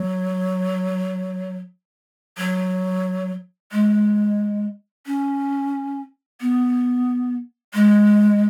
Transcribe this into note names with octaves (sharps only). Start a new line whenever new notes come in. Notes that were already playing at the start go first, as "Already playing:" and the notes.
Already playing: F#3
F#3
G#3
C#4
B3
G#3